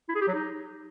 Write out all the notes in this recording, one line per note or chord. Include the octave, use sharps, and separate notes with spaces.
E4
G#4
G4
F#3
D#4